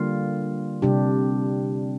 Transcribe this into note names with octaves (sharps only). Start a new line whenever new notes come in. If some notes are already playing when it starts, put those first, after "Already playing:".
Already playing: D3 G3 A#3 F4
C3 G3 D4 G4